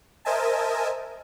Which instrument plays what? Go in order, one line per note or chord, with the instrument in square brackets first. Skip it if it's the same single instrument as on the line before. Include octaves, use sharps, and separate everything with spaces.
[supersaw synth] A#4 C5 D#5 E5 G#5 A5